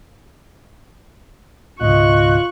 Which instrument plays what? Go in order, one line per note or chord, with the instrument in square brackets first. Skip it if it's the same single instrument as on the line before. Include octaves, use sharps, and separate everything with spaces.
[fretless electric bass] C#2 G#2 B2 [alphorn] F4 [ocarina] D#5 [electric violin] C#6 F#6